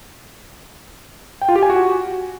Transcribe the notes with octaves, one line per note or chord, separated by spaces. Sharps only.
G5
F4
G4
G#5
F#4